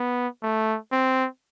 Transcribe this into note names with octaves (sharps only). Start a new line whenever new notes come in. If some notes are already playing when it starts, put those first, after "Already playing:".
Already playing: B3
A3
C4